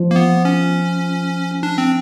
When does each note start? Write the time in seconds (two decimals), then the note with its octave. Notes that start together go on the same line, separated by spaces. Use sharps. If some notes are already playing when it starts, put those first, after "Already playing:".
Already playing: F3
0.11 A#3
0.16 B3
0.45 C#4
1.63 D4
1.78 C4